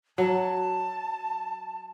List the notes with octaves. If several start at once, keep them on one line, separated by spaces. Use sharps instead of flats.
F#3 A5